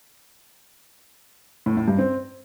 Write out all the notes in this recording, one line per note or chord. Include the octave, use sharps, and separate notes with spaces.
A2
A2
G2
C4